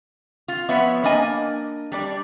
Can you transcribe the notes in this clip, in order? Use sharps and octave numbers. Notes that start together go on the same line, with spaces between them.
F4
F3 B3 B4 C#5 E5
A#3 D4 D#5 G#5
G3 D4 D5